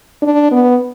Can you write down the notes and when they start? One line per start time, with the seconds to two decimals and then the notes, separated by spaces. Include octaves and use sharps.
0.22 D4
0.51 B3